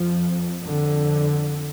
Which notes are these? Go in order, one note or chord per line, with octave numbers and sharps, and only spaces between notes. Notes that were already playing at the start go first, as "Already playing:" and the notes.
Already playing: F2 F3
F2 D3